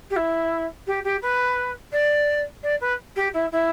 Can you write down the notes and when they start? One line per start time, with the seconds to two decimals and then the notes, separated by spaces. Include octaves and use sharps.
0.10 G4
0.16 E4
0.87 G4
1.04 G4
1.22 B4
1.92 D5
2.63 D5
2.80 B4
3.16 G4
3.33 E4
3.51 E4